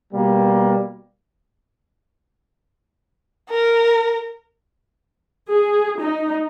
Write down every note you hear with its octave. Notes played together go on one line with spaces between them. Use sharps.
B2 G3 A#3
A#4
G#4
D#4